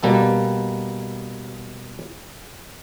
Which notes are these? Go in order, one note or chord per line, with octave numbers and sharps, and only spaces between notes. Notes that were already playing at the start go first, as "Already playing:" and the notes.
B2 G3 A#3 A4